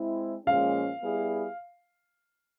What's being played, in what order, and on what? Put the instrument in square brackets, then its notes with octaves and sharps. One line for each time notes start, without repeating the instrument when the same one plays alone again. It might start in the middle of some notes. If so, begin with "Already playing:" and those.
Already playing: [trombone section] G#3 C4 E4
[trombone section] A#2 F3 G#3 C#4 [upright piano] F5
[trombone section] G3 B3 E4 G#4